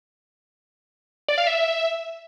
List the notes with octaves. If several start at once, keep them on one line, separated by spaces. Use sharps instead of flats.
D5
F5
E5